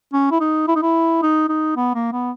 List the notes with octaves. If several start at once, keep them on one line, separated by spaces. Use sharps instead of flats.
C#4
E4
D#4
E4
D#4
E4
D#4
D#4
B3
A#3
B3